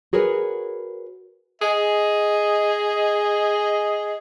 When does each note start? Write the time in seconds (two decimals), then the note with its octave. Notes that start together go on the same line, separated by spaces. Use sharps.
0.13 F#4 G#4 A#4 B4 C#5
1.62 G#4 D#5